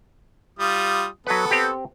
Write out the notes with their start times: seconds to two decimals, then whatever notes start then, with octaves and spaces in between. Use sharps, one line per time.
0.59 G3 F4 D#6
1.27 F#3 B3 A4 B4
1.51 C4 G4